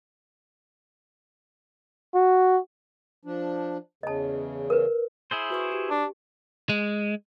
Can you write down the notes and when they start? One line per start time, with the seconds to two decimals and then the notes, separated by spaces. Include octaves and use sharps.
2.14 F#4
3.25 F3 D4
4.03 E2 C#3 D#5 A5
4.70 A#4 B4
5.31 E4 G#4 C5
5.50 F#4 B4 C#6
5.72 G4
5.90 D4
6.69 G#3